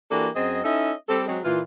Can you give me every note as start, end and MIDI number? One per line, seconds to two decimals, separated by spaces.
0.11 0.28 52
0.11 0.28 58
0.11 0.28 62
0.11 0.28 66
0.11 0.28 67
0.11 0.28 69
0.35 0.60 42
0.35 0.60 60
0.35 0.60 68
0.35 0.60 75
0.63 0.91 61
0.63 0.91 63
0.63 0.91 64
0.63 0.91 69
0.63 0.91 75
0.63 0.91 76
1.08 1.26 55
1.08 1.26 60
1.08 1.26 67
1.08 1.26 69
1.27 1.38 54
1.27 1.38 56
1.27 1.38 60
1.44 1.60 46
1.44 1.60 52
1.44 1.60 65